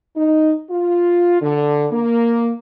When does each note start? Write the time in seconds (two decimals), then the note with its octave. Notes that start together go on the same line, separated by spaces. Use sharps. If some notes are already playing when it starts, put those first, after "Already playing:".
0.16 D#4
0.70 F4
1.41 D3
1.91 A#3